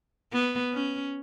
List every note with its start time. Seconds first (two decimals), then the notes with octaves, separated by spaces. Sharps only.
0.32 B3
0.73 C#4